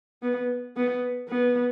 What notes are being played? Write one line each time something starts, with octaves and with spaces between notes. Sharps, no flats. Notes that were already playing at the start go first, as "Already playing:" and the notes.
B3
B3
B3